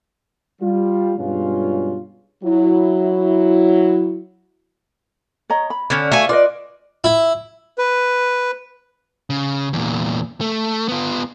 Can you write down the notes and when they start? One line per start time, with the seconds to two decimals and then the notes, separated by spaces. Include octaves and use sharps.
0.61 G3 F4
1.18 G2 B2 F#3 G#3 C#4 F4
2.43 F#3 E4
5.50 C#5 D#5 A#5
5.70 B5
5.90 D3 C#4
6.12 A3 F#4 D5 F5 G#5
6.29 F4 B4 D5 D#5
7.04 E4
7.78 B4
9.30 C#3
9.73 E2 A#2
10.41 A3
10.88 B3 F4